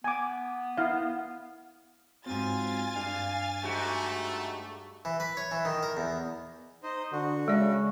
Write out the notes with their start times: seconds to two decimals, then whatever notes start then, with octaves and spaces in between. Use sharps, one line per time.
0.04 B3 G#5 D6
0.77 E4 F5
2.26 G#2 F#3 C4 F4 G#5 A6
2.96 G2 F5
3.64 G#2 A3 F#4 G4
5.05 E3
5.20 B4
5.37 C#5
5.51 E3
5.65 D#3
5.83 A#4
5.97 E2
6.83 D#4 C5 D#5
7.12 D3 F#4
7.48 C#3 G#3 D5